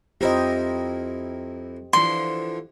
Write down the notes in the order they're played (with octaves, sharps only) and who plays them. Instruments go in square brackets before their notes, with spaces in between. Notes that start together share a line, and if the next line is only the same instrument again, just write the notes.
[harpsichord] F2 E4 A#4 [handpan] G4 C5 D#5
[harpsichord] D3 E3 F3 [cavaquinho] C6